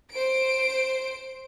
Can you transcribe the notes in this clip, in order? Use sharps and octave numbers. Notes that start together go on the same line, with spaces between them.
C5 D7